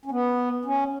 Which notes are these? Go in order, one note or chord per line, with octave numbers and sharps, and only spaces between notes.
C#4
B3
C#4